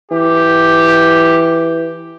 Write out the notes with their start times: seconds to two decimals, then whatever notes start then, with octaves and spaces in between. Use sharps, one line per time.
0.11 E3 G4